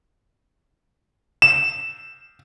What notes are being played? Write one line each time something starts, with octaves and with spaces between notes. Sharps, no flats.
E7